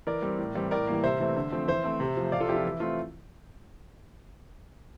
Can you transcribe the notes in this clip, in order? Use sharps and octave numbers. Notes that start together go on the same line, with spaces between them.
E3 A#4 D5
G3 C4
A2
E3 G3 C4
A2 A#4 D5
E3 G3 A#3
C3 C5 E5
E3 A3 C4
D3
F3 A3 C4
E3 C5 E5
A3 C4
C3
F3 A3
C3 D5 F5
F4 A4
F3 C4 E4 G4
F4
E3 E4
A3 C4 F4